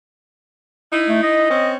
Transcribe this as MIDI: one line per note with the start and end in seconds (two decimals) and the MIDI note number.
0.92 1.47 63
0.92 1.47 64
1.08 1.23 57
1.23 1.71 75
1.49 1.76 60
1.49 1.76 61